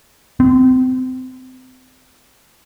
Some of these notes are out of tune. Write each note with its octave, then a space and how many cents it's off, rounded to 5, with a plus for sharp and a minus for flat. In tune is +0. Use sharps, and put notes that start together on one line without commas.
C4 -30